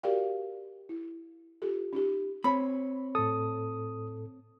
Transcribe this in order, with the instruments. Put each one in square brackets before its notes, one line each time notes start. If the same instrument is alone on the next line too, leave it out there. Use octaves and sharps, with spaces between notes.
[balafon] F#4 G4 A#4 D5 F5 G5
E4
F4 G4 A4
C#4 D#4 G4
[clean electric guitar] C4 C#5 [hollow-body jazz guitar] B5
[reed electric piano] A2 A4 [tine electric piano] D#6